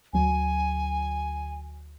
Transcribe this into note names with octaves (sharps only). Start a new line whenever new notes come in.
D2 F#3 G#5